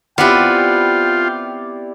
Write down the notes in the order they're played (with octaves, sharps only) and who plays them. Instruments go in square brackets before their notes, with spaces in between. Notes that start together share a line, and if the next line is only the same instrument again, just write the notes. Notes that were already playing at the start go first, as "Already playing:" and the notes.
[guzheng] B3 C4 B4 [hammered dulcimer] E4 G4 D5 [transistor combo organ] F4 [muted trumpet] G5